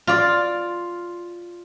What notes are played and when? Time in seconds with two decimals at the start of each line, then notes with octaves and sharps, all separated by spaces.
0.07 F4 D5